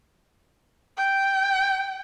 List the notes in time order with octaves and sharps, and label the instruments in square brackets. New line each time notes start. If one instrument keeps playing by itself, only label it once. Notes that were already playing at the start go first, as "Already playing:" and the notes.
[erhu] G5